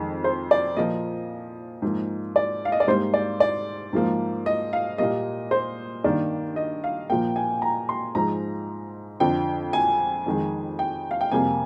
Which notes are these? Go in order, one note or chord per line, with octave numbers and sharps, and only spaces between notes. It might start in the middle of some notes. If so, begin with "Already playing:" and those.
Already playing: F2 D#3 G#3
C5
D5
A#2 F3 A#3 D#5
G#2 F3 A#3
D5
F5
D#5
D5
G#2 G3 A#3 C5
D5
D5
G#2 F3 A#3
D#5
F5
A#2 G3 A#3 D#5
C5
G2 D#3 A#3 D5
D#5
F5
A#2 F3 A#3 G5
G#5
A#5
C6
G#2 F3 G#3 A#5
F2 D3 F3 G5
G#5
F2 D#3 G#3
G5
F5
G5
F2 C3 G3 A#3 G#5